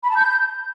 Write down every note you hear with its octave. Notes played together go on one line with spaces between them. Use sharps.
B5
A5
G6